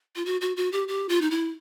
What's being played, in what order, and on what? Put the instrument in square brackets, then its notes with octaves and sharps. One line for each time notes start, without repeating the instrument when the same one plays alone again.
[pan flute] F4
F#4
F#4
F#4
G4
G4
F4
D#4
E4